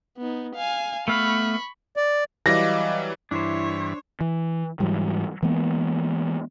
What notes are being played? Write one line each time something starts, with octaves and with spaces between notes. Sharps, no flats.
B3 D#4
F5 G#5
A3 B3 F5 B5 C#6
D5
E3 F#3 G3 D#5 F5 D6 A#6
G2 E3 D4 E4 C5 C#5
E3
G#2 E3 F#3 G3
E3 G#3 A#3 B3